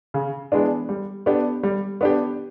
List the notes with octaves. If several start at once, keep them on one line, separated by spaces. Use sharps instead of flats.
C#3
E3 G#3 B3 D4
G3
B3 D4 G4
G3
B3 D4 G4